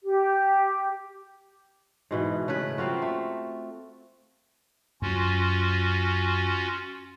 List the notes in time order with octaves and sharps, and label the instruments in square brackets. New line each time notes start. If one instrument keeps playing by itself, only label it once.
[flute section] G4
[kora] G#2 B2 E3
C#3 A3 B4
A#3 C4 F4 F#4
A3
[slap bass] F#2 [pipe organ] C#4 F4 F#4